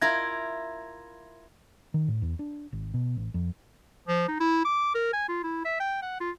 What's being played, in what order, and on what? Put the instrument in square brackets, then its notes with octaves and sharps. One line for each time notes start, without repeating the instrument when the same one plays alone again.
[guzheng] E4 F4 A#4 [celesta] G#6 A#6
[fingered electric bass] D#3
A2
E2
D4
G#1
B2
A1
F2
[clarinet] F3
D#4
E4
D6
A#4
G#5
F4
E4
E5
G5
F#5
F4